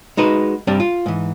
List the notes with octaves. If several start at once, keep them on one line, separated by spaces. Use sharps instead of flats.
G#3 D#4 F#4 B4
G2 C3 G3 D4
F4
G#2 E3